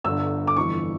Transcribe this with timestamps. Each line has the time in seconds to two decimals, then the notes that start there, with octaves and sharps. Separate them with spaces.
0.04 G1 G2 D3 E6
0.47 D6
0.56 G1 F2 E3 C#6